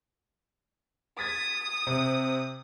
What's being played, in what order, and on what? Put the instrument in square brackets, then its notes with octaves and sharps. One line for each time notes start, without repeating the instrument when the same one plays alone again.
[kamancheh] D#6 [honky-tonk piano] G#6 A6 B6
[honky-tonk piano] C3